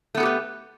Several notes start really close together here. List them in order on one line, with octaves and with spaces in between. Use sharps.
A3 B3 A4 G4 B4